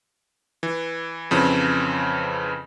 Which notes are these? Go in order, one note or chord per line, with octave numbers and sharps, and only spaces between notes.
E3
F2 C#3 E3 C4